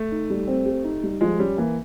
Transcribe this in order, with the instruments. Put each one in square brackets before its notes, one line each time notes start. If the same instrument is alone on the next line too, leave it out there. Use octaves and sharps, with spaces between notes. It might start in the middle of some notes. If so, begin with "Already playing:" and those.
Already playing: [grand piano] A3
[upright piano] D#4
G3
C4
G4
D#4
G3
[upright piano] F3 [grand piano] G#3
[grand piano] G3 [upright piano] C#4
[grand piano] E3 [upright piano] A#3